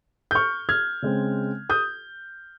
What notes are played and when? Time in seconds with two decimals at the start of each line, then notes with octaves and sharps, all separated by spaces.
0.31 G6
0.35 C#6 F6
0.69 F6 G#6
1.02 C#3 G#3 C4
1.70 D#6 G6